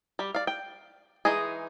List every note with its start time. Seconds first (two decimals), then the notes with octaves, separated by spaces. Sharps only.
0.19 G3 G4
0.34 D5 F5
0.47 G5
1.25 E3 G#3 D#4 G#4